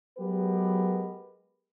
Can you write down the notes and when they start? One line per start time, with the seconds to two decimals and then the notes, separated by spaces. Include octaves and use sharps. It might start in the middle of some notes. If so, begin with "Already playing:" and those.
0.18 F#3 G#3 B3 G4 A#4 B4